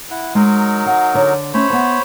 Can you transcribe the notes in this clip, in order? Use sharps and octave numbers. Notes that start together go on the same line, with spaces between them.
E4 F#5
F#3 G#3 D#4 A#4
F5 F#5
D3 C#5
A3 C4 C#4 C5 C#5 B5
B3 E5 A5